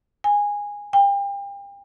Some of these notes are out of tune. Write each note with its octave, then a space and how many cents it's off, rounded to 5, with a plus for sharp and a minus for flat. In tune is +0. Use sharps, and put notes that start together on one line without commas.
G#5 -15
G5 +35